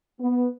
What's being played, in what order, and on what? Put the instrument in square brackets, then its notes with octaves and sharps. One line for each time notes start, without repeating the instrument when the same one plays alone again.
[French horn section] B3